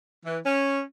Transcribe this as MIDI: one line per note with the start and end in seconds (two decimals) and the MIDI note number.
0.25 0.38 52
0.44 0.81 61